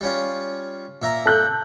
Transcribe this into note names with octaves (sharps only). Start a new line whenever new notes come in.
G3 C#4 F4
A#2 E5 A#5
A4 F#6 G6